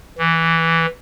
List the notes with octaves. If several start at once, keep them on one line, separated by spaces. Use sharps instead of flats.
E3